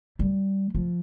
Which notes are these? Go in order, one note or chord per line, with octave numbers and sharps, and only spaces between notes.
G3
F3